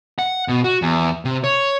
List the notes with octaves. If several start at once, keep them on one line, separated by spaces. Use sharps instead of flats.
F#5
B2
F#4
E2
C3
C#5